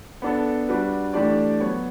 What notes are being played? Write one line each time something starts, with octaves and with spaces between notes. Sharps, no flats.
B3 D4 A4
G3 D4 F#4 B4
E3 A3 D4 G4 D5
F#3 B3 F#4 C#5